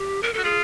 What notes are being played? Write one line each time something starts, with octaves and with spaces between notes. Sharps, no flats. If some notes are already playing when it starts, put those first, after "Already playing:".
Already playing: G4
A#4
F#4 A4
F4 G#4